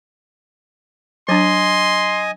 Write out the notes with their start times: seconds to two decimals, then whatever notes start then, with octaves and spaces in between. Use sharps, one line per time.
1.29 F#3 D4 D#5 G#5 C6